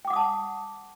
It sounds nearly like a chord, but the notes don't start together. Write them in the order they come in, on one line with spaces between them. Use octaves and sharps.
G5 D6 F#5 D#6 A5